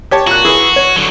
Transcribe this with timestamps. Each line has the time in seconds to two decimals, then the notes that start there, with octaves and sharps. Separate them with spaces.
0.11 G4 C#5 A5
0.27 A#2 F#4 F#6
0.45 E3 G#4
0.76 C#5
0.96 D3 F#3